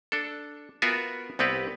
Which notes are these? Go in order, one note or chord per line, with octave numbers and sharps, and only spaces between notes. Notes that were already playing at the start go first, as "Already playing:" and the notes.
D4 A4
B3 F4 F#4 A#4 E5 G#5
C2 B3 C4 G4 B4